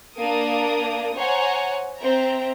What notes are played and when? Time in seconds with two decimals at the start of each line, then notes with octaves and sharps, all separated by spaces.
0.17 A#3 D4 A#4 D#6
1.15 C5 C#5 F#5 G#5 A#5
1.98 C4 E5 A#5